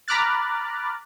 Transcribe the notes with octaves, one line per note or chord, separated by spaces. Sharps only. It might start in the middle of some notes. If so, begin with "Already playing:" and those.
A#5 B5 D6 F6 F#6 A6